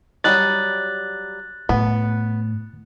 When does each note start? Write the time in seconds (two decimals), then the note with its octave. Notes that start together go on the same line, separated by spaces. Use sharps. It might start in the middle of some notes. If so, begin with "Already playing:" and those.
0.24 F#3 G3 D#5 F#6 A6
1.69 A2 B3